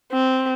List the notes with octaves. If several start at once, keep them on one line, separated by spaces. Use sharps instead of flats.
C4